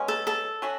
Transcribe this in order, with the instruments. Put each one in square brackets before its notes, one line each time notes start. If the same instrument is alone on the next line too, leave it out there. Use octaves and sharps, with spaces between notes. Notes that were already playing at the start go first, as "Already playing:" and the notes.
Already playing: [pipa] B2 G#3 C#4
[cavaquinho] A4
A4
[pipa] F#3 C#4 F#4